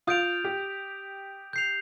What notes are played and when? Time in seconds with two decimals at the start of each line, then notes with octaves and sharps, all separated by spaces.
0.07 F4 D#6 G6 D7 F7
0.44 G4
1.53 G6 C7 F7